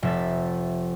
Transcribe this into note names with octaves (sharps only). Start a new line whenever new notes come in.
F1 E5 A6